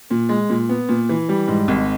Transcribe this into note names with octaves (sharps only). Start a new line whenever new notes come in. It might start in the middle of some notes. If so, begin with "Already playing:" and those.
A#2
G#3
A#2
B3
A#2
E3
G3
G#2
G#1